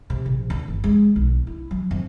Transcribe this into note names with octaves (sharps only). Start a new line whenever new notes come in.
C3
A#1
E2
G1
G#3
B1
E4
F#3
F2